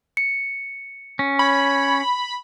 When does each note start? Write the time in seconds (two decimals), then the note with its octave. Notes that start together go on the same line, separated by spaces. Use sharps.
0.17 C#7
1.19 C#4
1.39 C#5 B5